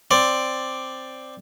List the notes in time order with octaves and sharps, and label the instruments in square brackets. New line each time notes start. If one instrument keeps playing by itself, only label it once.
[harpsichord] C4 D5